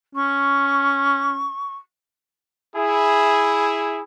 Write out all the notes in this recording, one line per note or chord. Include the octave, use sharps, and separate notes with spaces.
C#4 C#6
E4 G#4